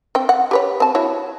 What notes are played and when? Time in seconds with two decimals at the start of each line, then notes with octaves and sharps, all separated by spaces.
0.15 C4 G5
0.29 F#5
0.51 G4 B4 C#5
0.80 C4 A5
0.95 E4 F#4 C#5